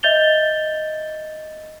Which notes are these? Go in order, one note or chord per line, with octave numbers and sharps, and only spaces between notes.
D#5 E5 G6 A6 F7 G7